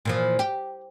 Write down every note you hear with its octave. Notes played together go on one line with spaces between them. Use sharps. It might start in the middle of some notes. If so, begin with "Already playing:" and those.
A#2 E3 F3
G4